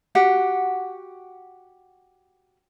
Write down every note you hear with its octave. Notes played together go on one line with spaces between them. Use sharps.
F#4 G4 F#5